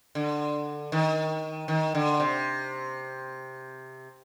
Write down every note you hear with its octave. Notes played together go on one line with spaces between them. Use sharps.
D3
D#3
D#3
D3
C3